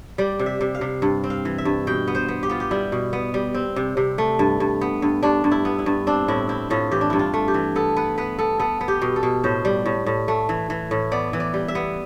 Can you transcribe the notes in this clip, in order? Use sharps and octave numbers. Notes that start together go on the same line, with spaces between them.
G3 D5
C3
E5
C3
F5
C3
G2
C4
F5
E3
E5
G2
B2 G5
B3
C5
B3
G4
B3 F4
G4
G3 E4
B2
B3
G3
C4
C3
C3
A3
G2
G2
B3
G2
G2 D4
G2
E4
B3
E4
G2
C4 D4
A2 E4
C4 E4
A2 F4
E3 G4
D4
G2 E4
F4
A3
G4
E3
B3 A4
B3 B4
B3 B4
B3 A4
B3 A4
B3
G4
B2
A4
B2
A2 C5
G3
A2
A2
A3
E3
E3
A2
B3 D5
E3
D5
G3
E5
B3